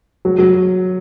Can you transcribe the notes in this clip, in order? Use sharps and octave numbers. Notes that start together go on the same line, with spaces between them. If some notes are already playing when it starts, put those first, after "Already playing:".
F#3
F#3